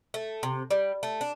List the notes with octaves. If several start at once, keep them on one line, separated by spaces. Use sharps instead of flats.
A3
C3
G3
A3
D4